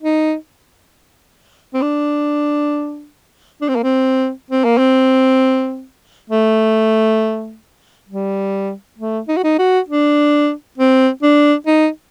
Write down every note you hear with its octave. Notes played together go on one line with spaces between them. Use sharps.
D#4
C4
D4
D4
C4
A#3
C4
C4
A#3
C4
A3
G3
A3
D#4
F#4
D#4
F#4
D4
C4
D4
D#4